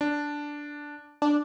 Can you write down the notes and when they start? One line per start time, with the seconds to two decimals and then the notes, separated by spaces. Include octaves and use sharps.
0.01 D4
1.22 D4